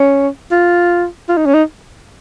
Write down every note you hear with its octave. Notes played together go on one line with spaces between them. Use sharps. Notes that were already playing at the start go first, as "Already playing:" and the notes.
Already playing: C#4
F4
F4
D#4
C#4
D#4